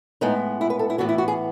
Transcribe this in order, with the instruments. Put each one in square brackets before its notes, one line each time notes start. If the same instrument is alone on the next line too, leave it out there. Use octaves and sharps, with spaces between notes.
[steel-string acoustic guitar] A2 G#3 B3 D#4
E4
B4
A4
E4
A2 E3 B3 F#4
E4
F#4
G#4